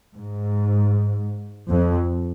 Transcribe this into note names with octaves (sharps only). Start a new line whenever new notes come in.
G#2
F2